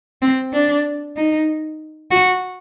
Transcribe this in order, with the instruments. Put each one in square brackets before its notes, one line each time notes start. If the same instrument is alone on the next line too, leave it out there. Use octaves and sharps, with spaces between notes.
[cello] C4
D4
D#4
F#4